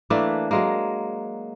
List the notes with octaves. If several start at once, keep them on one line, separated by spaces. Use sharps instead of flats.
E3 A3 A#3 D4
F#3 G#3 A#3